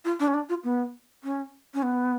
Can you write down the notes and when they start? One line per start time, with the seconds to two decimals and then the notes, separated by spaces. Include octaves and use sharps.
0.05 F4
0.20 D4
0.28 C#4
0.34 D4
0.49 F4
0.64 B3
1.24 C#4
1.74 C#4
1.83 B3